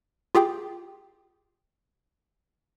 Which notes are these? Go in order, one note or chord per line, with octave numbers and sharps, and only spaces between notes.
F4 G4 G#4 G5 D6